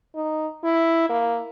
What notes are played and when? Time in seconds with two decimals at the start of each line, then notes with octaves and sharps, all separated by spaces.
0.16 D#4
0.64 E4
1.09 A#3